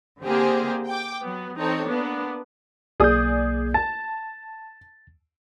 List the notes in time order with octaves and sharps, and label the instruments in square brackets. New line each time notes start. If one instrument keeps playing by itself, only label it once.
[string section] D3 A#3 C4 G4 G#4 C5
G5 D6
F#3 B3
E3 C4 D#4 A4 C#5
A#3 B3 D4
[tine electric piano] B1 A#3 G6 [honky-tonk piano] G#4 D5 D#6
[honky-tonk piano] A5 [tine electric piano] A6